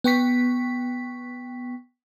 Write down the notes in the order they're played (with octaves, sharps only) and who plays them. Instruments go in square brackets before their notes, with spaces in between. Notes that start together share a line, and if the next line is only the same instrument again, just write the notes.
[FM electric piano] B3 G5 C#6 B6